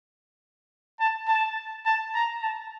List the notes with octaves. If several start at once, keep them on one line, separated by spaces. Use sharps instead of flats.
A5
A5
A5
A#5
A5